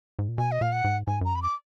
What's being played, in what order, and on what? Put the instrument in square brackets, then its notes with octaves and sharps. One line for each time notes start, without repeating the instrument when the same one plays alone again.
[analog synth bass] G#2
A#2
[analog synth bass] B2 [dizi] G#5
[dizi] D#5
[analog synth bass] A#2 [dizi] F5
[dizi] F#5
[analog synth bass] G#2
[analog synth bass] G#2 [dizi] G#5
[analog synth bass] F#2 [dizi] A#5
[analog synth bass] F2 [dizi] B5
[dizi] D6